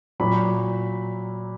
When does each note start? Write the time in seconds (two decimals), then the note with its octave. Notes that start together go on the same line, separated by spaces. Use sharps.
0.20 A#2 F#3 B5